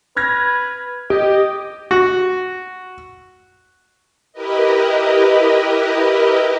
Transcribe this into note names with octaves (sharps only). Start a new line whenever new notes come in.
B4 F6 G#6 A#6
G4 D#5
F#4
E4 G4 A#4 B4 D#5